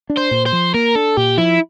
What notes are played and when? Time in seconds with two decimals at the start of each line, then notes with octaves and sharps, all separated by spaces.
0.10 D4
0.17 C5
0.31 A#2
0.46 C5
0.52 F3
0.74 A#3 A#4
0.95 D4 A4
1.17 A#2 G4
1.38 F3 E4